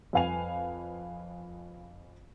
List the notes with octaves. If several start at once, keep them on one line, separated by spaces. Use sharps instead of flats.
F2 B4 F5 G#5 F7